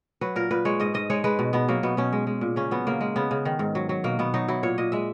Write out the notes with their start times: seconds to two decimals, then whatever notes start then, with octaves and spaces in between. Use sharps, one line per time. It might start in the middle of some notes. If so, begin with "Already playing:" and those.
0.21 F#3 B4
0.36 A#2 A#4
0.51 A#2 B4
0.65 G#3 C#5
0.80 G#2 D#5
0.94 G#2 D#5
1.10 G#3 C#5
1.24 G#3 B4
1.39 B2
1.53 B2 B3
1.68 F#3 A#3
1.83 B2 B3
1.97 B2 C#4
2.13 G#3
2.27 G#3
2.41 A#2
2.56 C#3 C#4
2.71 F#3 B3
2.87 C#3 A#3
3.01 G#3
3.16 C#3 B3
3.31 C#3
3.45 D#3
3.59 G#2
3.75 F#3
3.89 F#3
4.04 B2 A#3
4.19 B2 B3
4.34 F#3 D#4
4.48 F#3 E4
4.63 A#2 C#5
4.78 A#2 D#5
4.92 G#3 E5